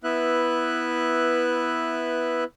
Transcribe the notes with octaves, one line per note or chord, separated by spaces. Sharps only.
B3 E4 B4 E5 F#6